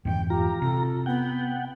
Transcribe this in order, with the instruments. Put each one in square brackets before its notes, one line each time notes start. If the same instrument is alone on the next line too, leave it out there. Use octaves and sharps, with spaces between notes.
[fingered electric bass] F2 G#2 E3 [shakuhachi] G5
[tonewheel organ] F4 A#5 [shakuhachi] G4
[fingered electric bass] C3 [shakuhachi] A4
[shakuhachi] B3 [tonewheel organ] F#5 G5